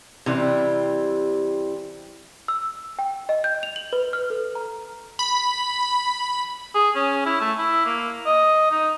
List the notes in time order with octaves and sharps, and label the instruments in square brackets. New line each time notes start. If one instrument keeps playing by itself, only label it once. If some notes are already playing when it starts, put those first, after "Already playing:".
[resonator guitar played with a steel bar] C3 E3 G3 C4
[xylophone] E6
G5
D#5
G6
F7
F#7
B4
F6
A4
A#5
[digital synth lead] B5
[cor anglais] G#4
C#4
E4
A3
E4
A#3
D#5
D#4